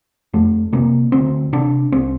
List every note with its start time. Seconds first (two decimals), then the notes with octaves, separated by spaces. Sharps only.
0.33 F2 A3
0.73 C3 A#3
1.12 D2 C4
1.53 C3 D4
1.92 C2 C4